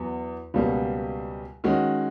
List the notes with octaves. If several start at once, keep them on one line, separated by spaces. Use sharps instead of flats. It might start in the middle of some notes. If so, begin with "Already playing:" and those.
Already playing: E2 F#3
C#2 B2 G3 A#3
D#3 G#3 C#4 F#4